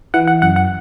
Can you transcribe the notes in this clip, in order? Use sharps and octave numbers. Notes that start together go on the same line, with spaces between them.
E3 F#5
F#5
F#2 F#5
F#5